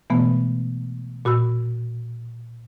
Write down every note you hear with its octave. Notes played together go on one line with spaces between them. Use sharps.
B2 E3 G#3 A3 B3
A#2 F#4 B5 E6